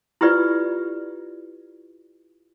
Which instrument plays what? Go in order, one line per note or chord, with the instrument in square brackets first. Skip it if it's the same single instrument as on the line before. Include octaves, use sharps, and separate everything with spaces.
[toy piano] E4 F4 G4 B4 D5